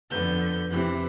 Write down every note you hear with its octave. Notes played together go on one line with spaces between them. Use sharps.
F2 D3 B3 G6
F2 C3 E3